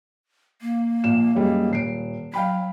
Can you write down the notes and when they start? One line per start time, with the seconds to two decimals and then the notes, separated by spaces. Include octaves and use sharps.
0.62 A#3
1.04 A#1 A#2 E7
1.35 F#2 G3 G#3
1.71 D#1 C7 D7
2.34 F#3 F5 G5 B5